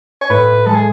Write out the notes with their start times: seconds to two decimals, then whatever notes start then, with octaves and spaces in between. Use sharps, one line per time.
0.21 C#5
0.30 A2 B4
0.66 G#3 A4
0.75 G#4